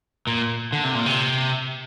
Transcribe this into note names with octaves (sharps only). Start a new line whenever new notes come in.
A#2
D3
C3
A#2
C3